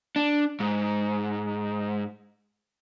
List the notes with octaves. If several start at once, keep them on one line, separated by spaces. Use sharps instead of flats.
D4
G#2